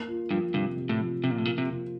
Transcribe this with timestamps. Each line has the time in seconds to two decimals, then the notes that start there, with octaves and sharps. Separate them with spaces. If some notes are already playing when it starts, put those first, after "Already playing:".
Already playing: A#3
0.08 F4
0.31 G2 F3
0.54 G2 C3
0.77 C3
0.89 A2
1.00 F3
1.24 C3 F3
1.31 A#2
1.38 A2
1.45 A#2 A#3
1.58 C3
1.70 F4